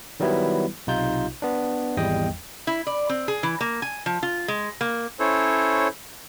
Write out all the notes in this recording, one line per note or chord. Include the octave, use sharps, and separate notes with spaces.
D#3 F#3 G3 B3 E4 B4
B1 C3 D#4 F4 G6
B3 D4
G#1 E2 G3 D#5 G5 D#6
E4
D5
C4
G#4
E3
A#3
G#5
F3
F4
G#3
A#3
C#4 E4 A4 C5 C#5